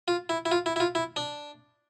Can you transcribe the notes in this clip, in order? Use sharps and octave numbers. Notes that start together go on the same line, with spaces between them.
F4
E4
E4
F4
E4
E4
F4
E4
D4